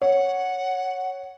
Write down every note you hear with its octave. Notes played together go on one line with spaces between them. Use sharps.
C#5 F#5